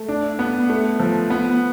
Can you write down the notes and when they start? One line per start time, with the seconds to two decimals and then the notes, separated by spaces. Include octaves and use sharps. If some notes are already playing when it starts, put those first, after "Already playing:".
Already playing: A3
0.08 D4
0.39 B3
0.69 A3
1.00 F3
1.30 B3